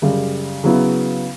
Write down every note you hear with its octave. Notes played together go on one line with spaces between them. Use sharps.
F#2 C#3 G3
C#3 F#3 B3 E4